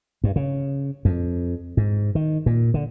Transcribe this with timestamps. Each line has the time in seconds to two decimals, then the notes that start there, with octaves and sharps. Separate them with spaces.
0.24 G2
0.36 C#3
1.05 F2
1.77 G#2
2.15 D#3
2.46 A#2
2.74 D3